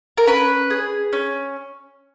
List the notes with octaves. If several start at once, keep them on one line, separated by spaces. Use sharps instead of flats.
A#4
C#4 B4
G#4
C#4